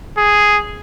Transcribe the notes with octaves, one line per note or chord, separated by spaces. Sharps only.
G#4